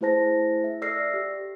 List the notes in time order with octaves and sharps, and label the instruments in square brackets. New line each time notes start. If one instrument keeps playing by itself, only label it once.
[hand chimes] A3 E4 G#4 C5 A5 A#6
E5
A4 D5 E6 F6 A#6 C7
G4